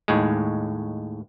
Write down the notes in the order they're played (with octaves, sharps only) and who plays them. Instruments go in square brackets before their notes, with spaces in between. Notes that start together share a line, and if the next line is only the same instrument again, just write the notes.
[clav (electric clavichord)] D#2 A2 G#3